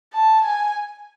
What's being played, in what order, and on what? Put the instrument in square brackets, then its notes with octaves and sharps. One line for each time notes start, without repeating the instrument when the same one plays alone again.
[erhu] A5
G#5